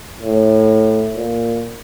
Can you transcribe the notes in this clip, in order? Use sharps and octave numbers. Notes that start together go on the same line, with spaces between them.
A2
A#2